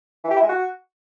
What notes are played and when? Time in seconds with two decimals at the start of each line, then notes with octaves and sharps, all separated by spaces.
0.24 E3
0.30 G4
0.36 E4
0.43 G#3
0.49 F#4